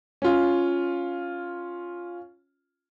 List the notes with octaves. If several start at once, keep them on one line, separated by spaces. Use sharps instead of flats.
C#4 F4